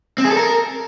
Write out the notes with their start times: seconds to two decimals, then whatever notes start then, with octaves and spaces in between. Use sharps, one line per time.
0.18 C4
0.25 G#4
0.31 A4
0.37 A#4